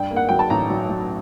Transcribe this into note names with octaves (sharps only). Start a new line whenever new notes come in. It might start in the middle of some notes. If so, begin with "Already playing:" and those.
Already playing: G2 G5
A#3
F#5
F#3 G5
A5
A1 A#5
F#3
F#3